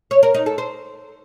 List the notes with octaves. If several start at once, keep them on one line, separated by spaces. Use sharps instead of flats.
C#5
A#4
D#4
A4
C5